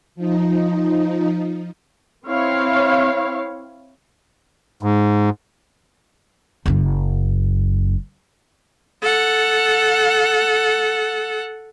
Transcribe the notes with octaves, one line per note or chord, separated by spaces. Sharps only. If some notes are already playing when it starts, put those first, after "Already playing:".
F3 D#4
C4 E4 C#5 F5
G#2
F#1 F#2
A4 F#5